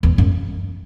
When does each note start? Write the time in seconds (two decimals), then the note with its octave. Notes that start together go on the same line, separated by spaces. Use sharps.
0.03 E2
0.18 F#2